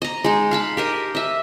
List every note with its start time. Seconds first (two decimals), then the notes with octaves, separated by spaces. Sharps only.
0.02 D#5 A#5
0.24 G#3 D#4
0.51 F5 A5 B5
0.77 G4 A#4 D#5
1.15 D#5 E5